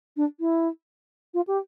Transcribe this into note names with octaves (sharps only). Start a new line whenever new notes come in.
D4
E4
F4
G4